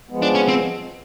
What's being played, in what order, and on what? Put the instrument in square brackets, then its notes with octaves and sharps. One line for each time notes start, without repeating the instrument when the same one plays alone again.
[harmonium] F3 G#3 B3
[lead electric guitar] D4
C#4
C4